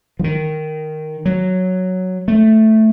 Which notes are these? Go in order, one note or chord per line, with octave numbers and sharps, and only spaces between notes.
F3
D#3
F#3
A3